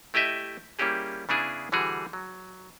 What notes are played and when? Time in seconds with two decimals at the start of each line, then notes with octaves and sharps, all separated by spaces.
0.14 A3 E4 G4 D#5 E5
0.79 G3 A#3 C#4 E4 G4 G#4
1.29 C#3 B3 D4 E4 G#4 G#5
1.72 D3 E3 G3 F#4 G#4
2.13 F#3